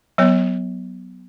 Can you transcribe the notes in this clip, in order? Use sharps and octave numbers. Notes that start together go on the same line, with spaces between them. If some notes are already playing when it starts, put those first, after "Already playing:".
F#3 B3 C#5